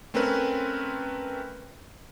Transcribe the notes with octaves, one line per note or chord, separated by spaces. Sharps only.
A3 C4 C#4 A#4 B4